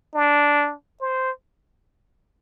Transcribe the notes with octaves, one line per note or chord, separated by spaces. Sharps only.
D4
C5